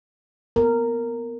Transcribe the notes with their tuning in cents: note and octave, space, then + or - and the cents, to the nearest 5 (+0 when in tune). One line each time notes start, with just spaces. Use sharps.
B3 +0 A#4 -10